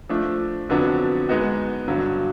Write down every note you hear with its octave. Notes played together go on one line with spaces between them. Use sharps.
F3 A3 D4
F2 D3 F#3 B3 D4
G#3 B3 D#4 F#4
G2 D3 F#3